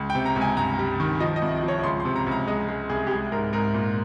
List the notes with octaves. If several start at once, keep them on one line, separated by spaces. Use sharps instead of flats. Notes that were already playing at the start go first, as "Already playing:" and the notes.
Already playing: C#2
G5
C3
A#5
C#2
G#5
G2 A#5
G3
D#3
F3 D#5
D#5
C2
F3
C#5
C#2 C6
C6
C3
A#5
C#2
A#5
G#3 D#5
G#3
C2 G#4
G4
G#3 G#4
G#2 A#4
G#2 A#4
A#2